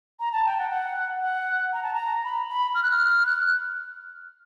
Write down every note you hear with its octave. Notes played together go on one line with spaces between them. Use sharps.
A#5
A5
G5
F#5
F#5
F#5
A#5
A5
A#5
B5
B5
F6
F#6
F6
F6
F#6